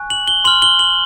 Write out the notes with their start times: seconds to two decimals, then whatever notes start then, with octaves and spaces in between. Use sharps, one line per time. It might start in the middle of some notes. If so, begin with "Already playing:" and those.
Already playing: G#5 C#6 F#6
0.10 F#7
0.28 G7
0.44 C6 F6 F#7
0.62 G7
0.79 F#7